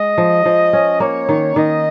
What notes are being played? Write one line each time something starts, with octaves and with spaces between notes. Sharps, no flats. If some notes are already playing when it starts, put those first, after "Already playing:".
Already playing: G#3 D#5
F3
F3
C#4
A#3 C#5
D#3
D#3 D#5